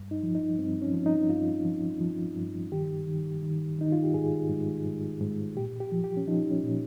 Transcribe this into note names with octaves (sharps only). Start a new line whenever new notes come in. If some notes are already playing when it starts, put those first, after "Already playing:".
Already playing: G2
D#4
F3
D#4
G2 C4
C#4
F3
D#4
G2 F4
F3
F3
G2
D#3 G4
D#3
D#3
D#3 D#4
F4
G4
G#2 G#4
G#2
G#2
G#2
A#2 G4
G4
F3
G4
C#4
F3 D#4
C#4
A#2